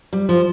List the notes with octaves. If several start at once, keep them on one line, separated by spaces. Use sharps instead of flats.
G3
F3